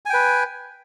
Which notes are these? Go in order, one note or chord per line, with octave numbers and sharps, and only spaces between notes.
B4 G5 G#5